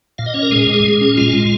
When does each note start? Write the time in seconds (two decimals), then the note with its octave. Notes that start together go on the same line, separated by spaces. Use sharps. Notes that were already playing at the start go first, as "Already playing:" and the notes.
0.18 A#2 F5
0.26 D#5
0.34 C#4 C#5
0.43 A#4
0.51 G#3 G#4
0.67 A#2
0.84 A#2
1.01 C#4
1.17 G#3 F4
1.33 A#2